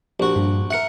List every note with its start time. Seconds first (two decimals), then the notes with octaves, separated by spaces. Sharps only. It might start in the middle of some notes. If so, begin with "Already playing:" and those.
0.20 A#1 F#4 G4
0.36 G2
0.70 A#4 E5 F#5 C#7